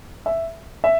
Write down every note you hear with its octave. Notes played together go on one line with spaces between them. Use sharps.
E5
E5